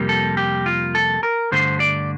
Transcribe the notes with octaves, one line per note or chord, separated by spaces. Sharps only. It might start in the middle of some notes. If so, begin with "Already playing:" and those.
Already playing: F2 C3 G3 A#3
A4
G4
F4
A4
A#4
G2 D3 A3 C5
D5